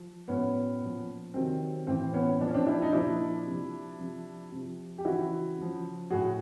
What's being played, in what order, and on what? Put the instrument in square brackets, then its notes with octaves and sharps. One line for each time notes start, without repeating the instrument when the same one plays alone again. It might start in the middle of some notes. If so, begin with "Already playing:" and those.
Already playing: [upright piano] F3
A2 F#3 B3 C#4
A#2 F3
C3 D#3 F#3 C4
A2 E3 C4
B3 C#4
A#2 F3 D4
C#4
C4 D4
D4 E4
D#4
A#2 F3 D4 E4
C3 F3
C3 F3
C3 F3
G4
C#3 E3 E4 F#4
C#3 F3
A2 F#3 F#4 G#4